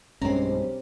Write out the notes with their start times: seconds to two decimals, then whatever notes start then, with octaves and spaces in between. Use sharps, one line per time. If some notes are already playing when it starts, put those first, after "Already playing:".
0.21 B1 G2 G#3 C4 C#4 G4 A#5